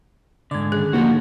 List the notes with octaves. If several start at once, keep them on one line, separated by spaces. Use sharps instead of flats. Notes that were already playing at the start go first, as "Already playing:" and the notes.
G#2 D3 D5 G#6
D#3 C#4 G#4
D#2 D3 F3 A3 A#3 F#4